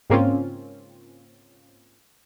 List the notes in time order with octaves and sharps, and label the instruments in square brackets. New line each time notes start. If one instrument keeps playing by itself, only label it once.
[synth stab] G#2 C#3 A#3 C4 C#4 F4